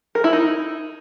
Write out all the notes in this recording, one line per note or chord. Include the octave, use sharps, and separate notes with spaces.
A#4
E4
D#4